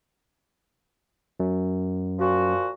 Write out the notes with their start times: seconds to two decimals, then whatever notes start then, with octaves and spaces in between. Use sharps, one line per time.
1.40 F#2
2.19 A#2 F3 F#4